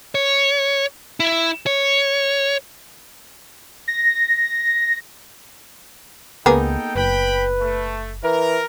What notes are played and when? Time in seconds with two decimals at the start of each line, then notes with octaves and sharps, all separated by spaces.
0.15 C#5
1.20 E4
1.66 C#5
3.88 A#6
6.46 C#2 A#3 B3 D#4 G#4 A4 G5
6.96 F#1 B4 G5 B5
7.60 A3
8.23 E3 A#4